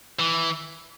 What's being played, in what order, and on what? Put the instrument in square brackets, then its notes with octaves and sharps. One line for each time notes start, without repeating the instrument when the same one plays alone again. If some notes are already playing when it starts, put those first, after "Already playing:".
[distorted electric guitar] E3